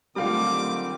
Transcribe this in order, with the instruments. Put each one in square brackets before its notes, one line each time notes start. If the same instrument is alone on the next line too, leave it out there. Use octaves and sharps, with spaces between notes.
[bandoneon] D3 D#3 C4 [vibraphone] F#3 A3 [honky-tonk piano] G3 F4 [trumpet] D6